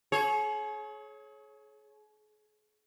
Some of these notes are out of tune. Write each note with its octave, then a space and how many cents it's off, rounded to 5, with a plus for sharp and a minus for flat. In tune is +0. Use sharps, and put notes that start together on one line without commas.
G#4 +40 C#5 -15